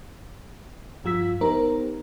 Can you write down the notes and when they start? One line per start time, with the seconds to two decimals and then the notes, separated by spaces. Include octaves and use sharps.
1.04 G2 F3 F4 E6 B6
1.41 B3 D#4 G4 A#4 C5 A#5